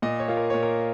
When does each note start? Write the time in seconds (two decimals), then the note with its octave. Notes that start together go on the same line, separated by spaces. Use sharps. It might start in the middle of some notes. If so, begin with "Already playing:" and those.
0.02 A#2 D#5
0.20 C#5
0.28 A#3 F4
0.37 A#4
0.50 A#2 C#5
0.63 A#4